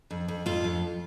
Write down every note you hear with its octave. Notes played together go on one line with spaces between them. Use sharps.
F2
F2
F2 F4
F2